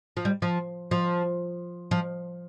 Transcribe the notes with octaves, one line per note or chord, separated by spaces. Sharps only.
F3
G3
F3
F3
F3